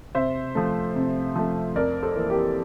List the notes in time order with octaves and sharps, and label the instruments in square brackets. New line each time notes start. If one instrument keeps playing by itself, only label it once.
[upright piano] C3 C5 E5
F3 A3
C3
F3 A3
F2 A#4 D5
A4 C5
E3 A#3
G4 A#4